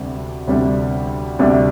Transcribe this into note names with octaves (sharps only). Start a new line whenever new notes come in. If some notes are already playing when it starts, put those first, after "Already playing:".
Already playing: D2 C3 G3 D4
D2 C3 G3 D4
D2 C3 G3 D4